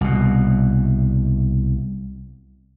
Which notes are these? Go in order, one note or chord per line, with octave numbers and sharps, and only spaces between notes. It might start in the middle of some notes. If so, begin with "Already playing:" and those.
C2 B2